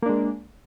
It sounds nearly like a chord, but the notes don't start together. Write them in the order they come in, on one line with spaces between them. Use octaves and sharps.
A#3 D4 G#3